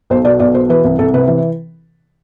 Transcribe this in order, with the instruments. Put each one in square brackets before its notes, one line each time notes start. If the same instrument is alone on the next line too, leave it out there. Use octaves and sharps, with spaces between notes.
[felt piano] B1 C5
B2 D5
B1 D5
B2 C5
E3 B4
C2
C2 A4
C3 B4
E3